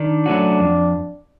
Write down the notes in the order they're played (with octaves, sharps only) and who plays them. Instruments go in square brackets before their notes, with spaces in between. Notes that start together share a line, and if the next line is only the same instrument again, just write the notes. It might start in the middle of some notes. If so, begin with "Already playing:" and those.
Already playing: [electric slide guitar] D#3 [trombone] D4
[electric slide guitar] F#3 A3 C#4 F#4
F2